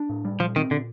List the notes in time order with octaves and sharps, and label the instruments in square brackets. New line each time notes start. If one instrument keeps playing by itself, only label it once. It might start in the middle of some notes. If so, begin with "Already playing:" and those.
Already playing: [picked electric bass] D4
A2
G3
[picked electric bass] A#2 [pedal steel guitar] F3
[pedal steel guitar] D#3 [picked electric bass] C4
[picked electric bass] A#2 [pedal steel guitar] D3